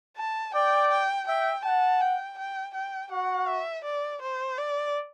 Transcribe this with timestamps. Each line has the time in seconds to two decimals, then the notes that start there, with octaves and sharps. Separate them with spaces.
0.17 A5
0.54 D5 G5
0.91 G5
1.27 E5 G5
1.65 F#5 A5
2.01 G5
2.38 G5
2.74 G5
3.11 F#4 F#5
3.48 E5
3.84 D5
4.22 C5
4.58 D5